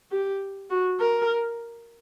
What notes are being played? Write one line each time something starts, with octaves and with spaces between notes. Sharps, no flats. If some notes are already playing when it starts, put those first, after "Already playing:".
G4
F#4
A#4